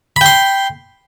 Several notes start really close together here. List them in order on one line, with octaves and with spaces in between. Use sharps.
B5 G5 C6